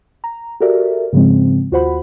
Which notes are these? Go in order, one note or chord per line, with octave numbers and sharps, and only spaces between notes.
A#5
F#4 G4 A4 A#4 D5 E5
G#2 C#3 F3 G#3 C4
D#2 F4 F#4 C5 F#5 B5